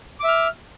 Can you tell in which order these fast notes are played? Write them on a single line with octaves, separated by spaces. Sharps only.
D6 E5 F6